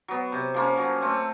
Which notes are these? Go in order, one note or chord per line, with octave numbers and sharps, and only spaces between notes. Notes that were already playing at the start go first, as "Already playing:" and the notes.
F#3 B3
C3
F3 A#3 C#4
F#3
A3 C4